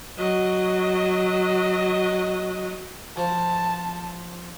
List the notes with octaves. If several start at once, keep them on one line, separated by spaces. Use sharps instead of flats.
F#3 D#5
F3 A5